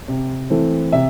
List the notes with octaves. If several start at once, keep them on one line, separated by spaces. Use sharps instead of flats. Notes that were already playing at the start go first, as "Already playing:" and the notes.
C3
E3 A3 C4 E4
C3 E5